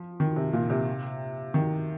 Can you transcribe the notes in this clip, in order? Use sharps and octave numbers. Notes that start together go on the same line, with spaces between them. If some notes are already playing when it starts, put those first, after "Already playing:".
Already playing: F3
D#3
C3
A#2
C3
D#3